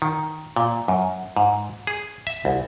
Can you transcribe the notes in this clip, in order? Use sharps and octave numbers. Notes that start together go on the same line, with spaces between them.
D#3
A#2
F#2
G#2
G#4
E5
C2